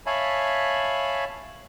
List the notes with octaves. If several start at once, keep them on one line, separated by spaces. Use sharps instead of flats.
C#5 E5 F5 G#5 A5 B5